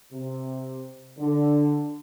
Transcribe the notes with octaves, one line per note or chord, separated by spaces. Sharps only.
C3
D3